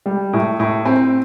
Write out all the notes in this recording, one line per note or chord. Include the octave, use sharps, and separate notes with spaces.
G3
A2
A2
C4